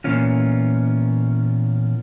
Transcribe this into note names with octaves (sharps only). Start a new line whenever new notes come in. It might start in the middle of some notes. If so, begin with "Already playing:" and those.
A#2 E3 A#3 B3 C#4 F4